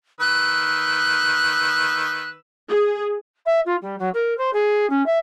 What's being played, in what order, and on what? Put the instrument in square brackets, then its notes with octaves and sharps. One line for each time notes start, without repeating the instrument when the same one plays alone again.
[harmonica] D#3 B4 E6 [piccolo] F#6
[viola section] G#4
[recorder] E5
F4
G3
F#3
A#4
C5
G#4
C#4
E5